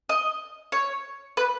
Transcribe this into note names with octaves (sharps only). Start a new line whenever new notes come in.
D#5
C#5
B4